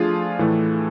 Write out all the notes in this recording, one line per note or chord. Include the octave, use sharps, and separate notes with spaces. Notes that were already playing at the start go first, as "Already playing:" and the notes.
Already playing: F3 A3 D4 F4 G#4
A2 E3 A3